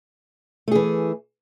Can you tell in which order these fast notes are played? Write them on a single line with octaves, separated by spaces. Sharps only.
A3 G#4 E3